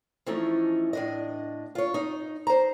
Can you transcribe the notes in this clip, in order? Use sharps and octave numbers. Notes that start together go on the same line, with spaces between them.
E3 F3 A3 C#4 D#4
A2 D4 D#5
F4 C#5
D#4
C5 A#5